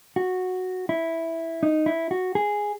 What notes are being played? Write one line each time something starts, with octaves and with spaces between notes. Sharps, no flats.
F#4
E4
D#4
E4
F#4
G#4